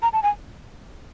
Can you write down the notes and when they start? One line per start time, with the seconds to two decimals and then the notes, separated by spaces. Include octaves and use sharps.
0.02 A#5
0.13 A5
0.23 G#5